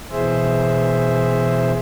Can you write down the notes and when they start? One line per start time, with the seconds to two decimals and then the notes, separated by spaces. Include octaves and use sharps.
0.12 B2 E3 G#4 C5 E5